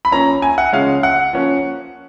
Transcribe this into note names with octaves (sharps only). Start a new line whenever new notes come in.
B5
F3 A#3 C#4 A#5
G#5
F#5
C#3 F3 G#3 C#4 F5
F#5
F3 A#3 C#4